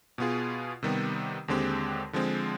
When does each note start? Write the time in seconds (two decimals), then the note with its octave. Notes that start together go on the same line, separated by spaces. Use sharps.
0.18 B2 B3 F4 G#4
0.83 C3 D#3 G3 B3
1.48 D#2 D3 G#3 C4 G4
2.13 D3 F3 G#3 C4